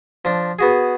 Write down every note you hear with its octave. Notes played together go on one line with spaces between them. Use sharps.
F3 D4
B3 F#4 G#4